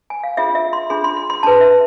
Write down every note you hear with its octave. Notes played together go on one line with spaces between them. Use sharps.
G#5
F5
D4 F4 G#4 E5
E5
C6
D4 F4 G#4 C6
C6
C6
C6
D4 G#4 B4 A5
E5